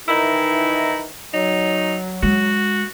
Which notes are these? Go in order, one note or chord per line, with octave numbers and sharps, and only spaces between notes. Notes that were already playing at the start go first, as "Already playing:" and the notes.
D#3 E3 D#4 E4
F#3 D#4
G#3 F#4